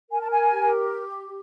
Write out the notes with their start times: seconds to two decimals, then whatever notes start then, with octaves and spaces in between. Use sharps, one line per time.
0.11 A#4 G#5
0.20 A5
0.29 G#5
0.50 G4